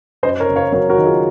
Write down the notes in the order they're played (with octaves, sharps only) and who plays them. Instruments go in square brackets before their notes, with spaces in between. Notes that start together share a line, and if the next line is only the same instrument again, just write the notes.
[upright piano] F#2 C5 D#5
A#4 C#5
F#1
C#5 F5
F#3 A#4 C#5
F#4 A#4
D#3
F4 G#4